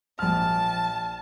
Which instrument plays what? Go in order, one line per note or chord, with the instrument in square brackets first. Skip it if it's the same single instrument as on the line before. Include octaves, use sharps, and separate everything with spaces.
[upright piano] A#1 F6 [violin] A5